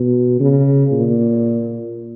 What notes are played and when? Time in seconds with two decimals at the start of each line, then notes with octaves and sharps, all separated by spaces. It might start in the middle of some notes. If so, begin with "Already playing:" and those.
Already playing: B2
0.40 C#3
0.92 A#2